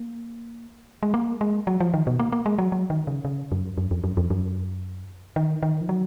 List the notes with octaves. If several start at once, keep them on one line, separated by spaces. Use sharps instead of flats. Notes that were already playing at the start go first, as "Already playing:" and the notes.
Already playing: A#3
G#3
A#3
G#3
F#3
F3
D#3
B2
A#3
A#3
G#3
F#3
F#3
D#3
C#3
C#3
F#2
F#2
F2
F#2
F2
F#2
D#3
D#3
F3
F#3